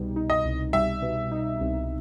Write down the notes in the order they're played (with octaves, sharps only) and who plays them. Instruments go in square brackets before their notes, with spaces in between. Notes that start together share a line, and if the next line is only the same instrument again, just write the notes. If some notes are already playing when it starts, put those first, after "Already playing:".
Already playing: [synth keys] C2 B2 G3 D#4
D#4
[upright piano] D#5
[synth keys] C2
[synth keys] G3 [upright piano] E5
[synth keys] B2
D#4
C2